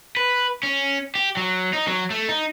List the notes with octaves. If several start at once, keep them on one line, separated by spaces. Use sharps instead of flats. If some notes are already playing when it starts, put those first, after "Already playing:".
B4
C#4
G4
F#3
D#4
F#3
A3
D#4